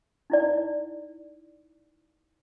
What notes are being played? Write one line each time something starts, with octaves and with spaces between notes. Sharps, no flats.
D#4 E4 D5